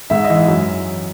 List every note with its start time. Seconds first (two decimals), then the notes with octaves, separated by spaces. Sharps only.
0.10 G#2 E5
0.24 D#5
0.30 E3
0.37 E5
0.48 F#2